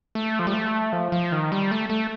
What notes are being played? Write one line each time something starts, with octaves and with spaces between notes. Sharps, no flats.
A3
F3
G3
A3
F3
F3
D#3
G3
A3
A3